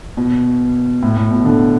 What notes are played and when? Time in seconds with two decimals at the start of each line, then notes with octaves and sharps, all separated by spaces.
0.17 B2
1.03 A2
1.17 A2
1.31 B2
1.45 D3